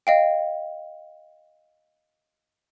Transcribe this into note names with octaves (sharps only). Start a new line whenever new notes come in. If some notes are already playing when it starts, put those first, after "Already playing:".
D#5 F5 G5